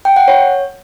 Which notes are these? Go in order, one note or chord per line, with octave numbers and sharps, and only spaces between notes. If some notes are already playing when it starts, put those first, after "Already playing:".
G5
F#5
C#5